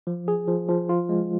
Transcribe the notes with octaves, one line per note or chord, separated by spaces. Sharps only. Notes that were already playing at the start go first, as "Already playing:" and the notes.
F3
G#4
F3
F3
F4
G#3